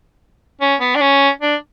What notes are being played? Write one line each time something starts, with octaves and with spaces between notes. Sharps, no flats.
C#4
B3
D4
C#4
D4